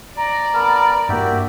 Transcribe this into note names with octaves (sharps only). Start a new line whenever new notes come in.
D5 A#5
B3 A#4 A5
G2 A#3 F#4 G4 E5